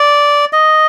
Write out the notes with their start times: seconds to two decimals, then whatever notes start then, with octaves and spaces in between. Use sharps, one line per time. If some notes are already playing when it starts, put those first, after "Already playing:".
Already playing: D5
0.53 D#5